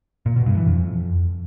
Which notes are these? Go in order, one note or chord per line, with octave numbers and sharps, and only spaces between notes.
A#2
B2
G2
E3
F2